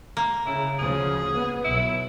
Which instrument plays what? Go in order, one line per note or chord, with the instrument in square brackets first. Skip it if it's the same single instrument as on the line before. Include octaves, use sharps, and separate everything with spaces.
[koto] A#3
[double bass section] C#3 [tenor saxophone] E4
[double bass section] D2 C#3 F3 [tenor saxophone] G#4
[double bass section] B3
[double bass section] B1 [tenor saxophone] E4